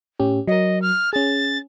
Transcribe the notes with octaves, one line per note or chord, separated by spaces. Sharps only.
A2 C#4 G4
F#3 A#4 D#5
F6
C#4 G#4 A6